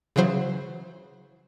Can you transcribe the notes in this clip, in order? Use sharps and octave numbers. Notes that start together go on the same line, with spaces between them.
C#3 E3 F#3 C5